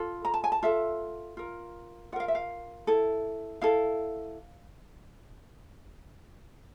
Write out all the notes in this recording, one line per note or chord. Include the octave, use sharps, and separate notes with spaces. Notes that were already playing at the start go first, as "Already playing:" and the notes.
Already playing: F4 A4
A#5
A5
G#5
A5
F4 A4 E5
F4 A#4
F4 A#4 F5 F#5
E5
F5
E4 A4
E4 A4 F5